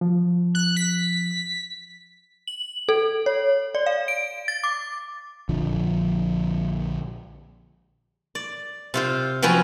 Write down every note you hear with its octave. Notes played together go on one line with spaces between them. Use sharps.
F3
F#6
B6
F#7
A4
C#5
D5
F5
D7
A6
D6
A#1 D3 F3
D5
C3 F4 C5
F3 F#3 C4 C#4 B4